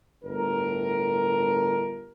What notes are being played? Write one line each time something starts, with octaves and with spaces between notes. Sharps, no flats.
G1 A2 D4 A#4